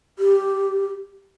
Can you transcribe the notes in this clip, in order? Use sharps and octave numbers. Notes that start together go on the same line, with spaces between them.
G4